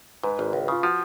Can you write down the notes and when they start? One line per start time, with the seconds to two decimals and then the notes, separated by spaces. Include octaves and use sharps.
0.23 G#2 B4
0.39 G#1
0.53 C#2
0.68 C#3 F4
0.83 F3 F#4